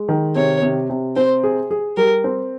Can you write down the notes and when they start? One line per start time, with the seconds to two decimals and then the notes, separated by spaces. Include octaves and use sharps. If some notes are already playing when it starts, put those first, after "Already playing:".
Already playing: G#3
0.09 D#3
0.36 C3 C#5
0.62 C3
0.90 C3
1.16 C4 C5
1.44 G#4
1.71 G#4
1.97 G3 A#4
2.24 C4